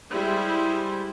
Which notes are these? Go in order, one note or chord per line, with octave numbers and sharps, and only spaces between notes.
G3 G#3 E4 C5